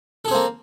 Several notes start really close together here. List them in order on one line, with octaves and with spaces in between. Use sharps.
A4 G#4 C4 A#3